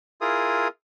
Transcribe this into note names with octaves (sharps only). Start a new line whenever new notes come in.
E4 F4 G#4 A#4 D#6